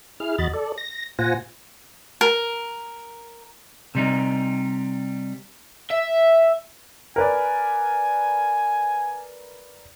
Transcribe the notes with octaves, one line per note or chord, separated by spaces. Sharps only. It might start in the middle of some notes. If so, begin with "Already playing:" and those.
E4 G#4 F6
E2 F#4 D#5 B5 A6
A4 D5
A#6
A#2 F4 C5 F#5 G#5 A#6
A#4
C3 G3 D#4
E5
A#4 B4 D5 G#5